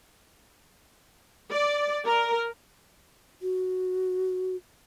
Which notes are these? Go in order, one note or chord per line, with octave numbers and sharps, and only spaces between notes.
D5
A#4
F#4